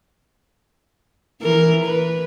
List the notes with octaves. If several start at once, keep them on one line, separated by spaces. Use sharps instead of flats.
E3 A#4
B4